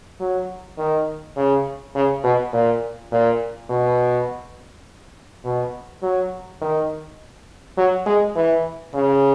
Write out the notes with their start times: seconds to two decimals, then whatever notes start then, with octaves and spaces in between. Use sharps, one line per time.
0.20 F#3
0.78 D#3
1.37 C#3
1.95 C#3
2.24 B2
2.53 A#2
3.12 A#2
3.70 B2
5.45 B2
6.03 F#3
6.61 D#3
7.77 F#3
8.06 G#3
8.36 E3
8.94 C#3